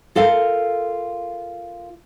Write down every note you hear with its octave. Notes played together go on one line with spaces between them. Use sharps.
F4 A4 A#4 F5